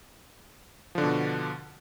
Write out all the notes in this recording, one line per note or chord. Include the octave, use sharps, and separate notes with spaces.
B2 D3 F3 D4